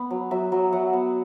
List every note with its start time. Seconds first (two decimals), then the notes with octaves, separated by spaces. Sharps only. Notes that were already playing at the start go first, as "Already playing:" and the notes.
Already playing: B3
0.10 F#3
0.31 F#3 E5
0.52 F#3
0.72 F#3 F#5
0.93 B3